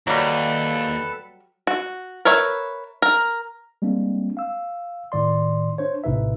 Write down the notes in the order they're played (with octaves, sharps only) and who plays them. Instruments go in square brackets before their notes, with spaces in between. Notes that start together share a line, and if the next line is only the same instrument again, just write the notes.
[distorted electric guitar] D#2 [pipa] F#3 G3 [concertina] A4 B4 A5
[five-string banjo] F#4
A#4 B4 C#5 E5
A#4
[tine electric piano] G3 G#3 A#3 C4 D4
F5 E6
A2 D#3 D5 C6
D4 C5 C#5
A#1 A2 C3 D#4 B4 E5